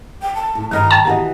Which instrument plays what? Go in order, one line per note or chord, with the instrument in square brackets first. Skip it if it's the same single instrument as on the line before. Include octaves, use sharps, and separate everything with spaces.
[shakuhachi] G5
A5
[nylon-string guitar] A2
[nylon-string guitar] G2 D#5 [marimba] D#3 F6 [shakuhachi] A#5
[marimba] G5 [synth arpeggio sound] A5
[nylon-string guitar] B2 E3 D#5 [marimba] G4 F#5